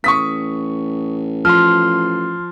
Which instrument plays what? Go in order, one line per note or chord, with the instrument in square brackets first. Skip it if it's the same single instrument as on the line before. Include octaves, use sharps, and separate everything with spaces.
[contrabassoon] A1 [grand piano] C#6 D#6 B6
[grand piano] F3 [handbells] C6 F6